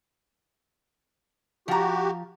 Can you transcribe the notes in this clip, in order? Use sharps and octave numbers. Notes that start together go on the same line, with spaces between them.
F3 F#4 G4 A#5